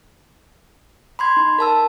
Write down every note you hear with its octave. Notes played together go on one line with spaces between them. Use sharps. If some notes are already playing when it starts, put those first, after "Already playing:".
B5 C6 G#6
D#4
A#4 A5 E6